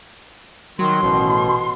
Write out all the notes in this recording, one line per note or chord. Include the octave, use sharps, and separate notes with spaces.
D#3 F#3 C6
A1 B2